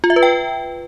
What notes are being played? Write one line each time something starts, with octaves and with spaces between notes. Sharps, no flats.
F4
E5
B4
G5